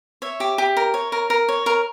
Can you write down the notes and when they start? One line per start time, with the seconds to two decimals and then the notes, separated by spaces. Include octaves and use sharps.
0.22 C#5 E5
0.40 G4
0.58 G4
0.77 A#4
0.94 C#5
1.12 A#4
1.30 A#4
1.49 C#5
1.66 A#4